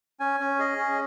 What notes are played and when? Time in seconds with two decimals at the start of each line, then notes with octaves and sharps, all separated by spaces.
0.20 C#4 G#5
0.40 C#4
0.59 G#4 D#5
0.78 C#4